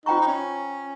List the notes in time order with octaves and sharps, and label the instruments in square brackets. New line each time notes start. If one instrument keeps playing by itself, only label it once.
[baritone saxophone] D#4 [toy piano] F4 C5 G5 A#5 C#6
[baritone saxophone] D#4
C#4